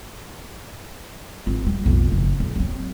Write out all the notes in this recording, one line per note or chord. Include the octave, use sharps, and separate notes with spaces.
G#1 F4
G3
B1 F2
F#1
D#1
F#3 C4